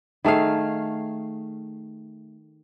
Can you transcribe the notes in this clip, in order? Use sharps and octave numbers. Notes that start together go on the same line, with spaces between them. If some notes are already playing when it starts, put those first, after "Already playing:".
D#3 A3 G#4 F5